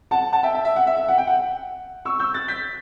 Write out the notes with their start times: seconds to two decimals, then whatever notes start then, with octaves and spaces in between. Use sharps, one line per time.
0.11 F#5 A5
0.33 F#5 A5
0.43 E5 G5
0.54 E5
0.65 E5
0.76 F#5
0.87 E5
0.97 E5
1.08 F#5
1.18 G5
1.27 F#5
2.05 C#6 E6
2.19 E6 G6
2.34 F#6 A6
2.48 G6 B6